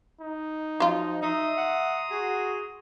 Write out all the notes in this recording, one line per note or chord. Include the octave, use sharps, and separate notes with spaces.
D#4
F3 F#3 F4
D#4 E5 A#5 C6 D#6
F#5
F#4 G#4